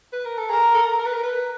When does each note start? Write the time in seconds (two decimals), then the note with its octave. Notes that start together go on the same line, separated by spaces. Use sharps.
0.12 B4
0.25 A#4
0.38 A4
0.49 G#4 A#4
0.74 A4
0.99 A#4
1.06 B4
1.14 A#4
1.23 B4